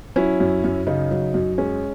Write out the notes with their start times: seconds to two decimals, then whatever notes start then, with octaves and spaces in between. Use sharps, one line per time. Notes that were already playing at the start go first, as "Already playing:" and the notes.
0.16 F#3 C#4 E4
0.40 F#2
0.64 F#2
0.87 C#3 D#4
1.11 F#3
1.34 F#2
1.58 G#3 C#4